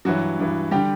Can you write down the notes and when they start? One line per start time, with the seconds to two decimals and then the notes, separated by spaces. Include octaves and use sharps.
0.05 G2 E3 F#3 F#4
0.39 G2 E3
0.71 D3 G3 G4